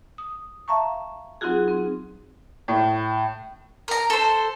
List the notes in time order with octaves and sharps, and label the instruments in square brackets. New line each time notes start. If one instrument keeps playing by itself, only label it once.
[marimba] D#6
E5 F5 A5 A#5 C#6
F#3 C4 D#4 F4 F#4 G#4
C4
[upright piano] A2
[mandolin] A#4 A#5
A4 C5